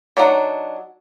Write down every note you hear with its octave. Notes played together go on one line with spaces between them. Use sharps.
F#3 D4 D#4 F#5